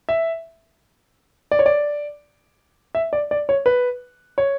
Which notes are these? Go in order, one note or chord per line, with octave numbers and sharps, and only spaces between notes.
E5
D5
C#5
D5
E5
D5
D5
C#5
B4
C#5